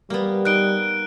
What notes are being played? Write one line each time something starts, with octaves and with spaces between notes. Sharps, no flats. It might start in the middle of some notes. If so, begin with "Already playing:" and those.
G3 A#3 B3
D#4 F#6 D7 G7